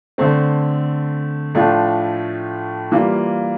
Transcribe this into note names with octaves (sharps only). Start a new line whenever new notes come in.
D3 A3 C4
A2 F3 A3 D4 F4
E3 G3 A#3 F4